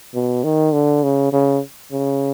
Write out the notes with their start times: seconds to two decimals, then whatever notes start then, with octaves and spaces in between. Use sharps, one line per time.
0.14 B2
0.44 D#3
0.73 D3
1.03 C#3
1.33 C#3
1.92 C#3